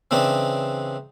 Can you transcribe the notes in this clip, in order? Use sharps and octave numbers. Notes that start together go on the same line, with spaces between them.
C#3 E3 C4 D4 D#4